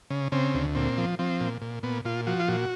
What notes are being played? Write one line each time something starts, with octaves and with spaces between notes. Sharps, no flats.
C#3
C#3 C4
D2
A#2 C4
F3
F3 C4
A#2
A#2
A#2 B3
A#2 F4
F3 F#4
F4
A#2 F#4